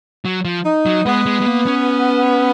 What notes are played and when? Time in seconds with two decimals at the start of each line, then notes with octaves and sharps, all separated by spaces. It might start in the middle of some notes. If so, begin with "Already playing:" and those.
0.25 F#3
0.45 F3
0.65 D#4
0.86 F#3
1.06 G#3 B3
1.26 G#3
1.41 G#3
1.46 A#3
1.67 C#4